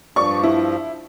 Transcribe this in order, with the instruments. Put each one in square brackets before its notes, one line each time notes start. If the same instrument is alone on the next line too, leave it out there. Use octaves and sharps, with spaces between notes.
[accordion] G2 F3 [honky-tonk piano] D5 C#6
[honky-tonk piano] E4